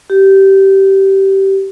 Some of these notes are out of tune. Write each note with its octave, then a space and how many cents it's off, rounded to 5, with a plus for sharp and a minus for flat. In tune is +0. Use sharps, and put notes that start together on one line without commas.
G4 -20